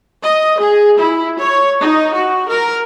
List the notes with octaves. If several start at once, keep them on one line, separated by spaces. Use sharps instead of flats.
D#5
G#4
E4
C#5
D#4
F#4
A#4